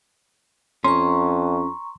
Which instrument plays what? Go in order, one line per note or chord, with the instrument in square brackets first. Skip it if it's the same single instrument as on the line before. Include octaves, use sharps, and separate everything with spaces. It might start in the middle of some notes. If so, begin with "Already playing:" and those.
[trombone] F2 [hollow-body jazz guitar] C#4 [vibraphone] A#5 C#6 [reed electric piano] C6